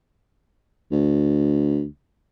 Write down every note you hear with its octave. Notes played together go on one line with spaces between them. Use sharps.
D2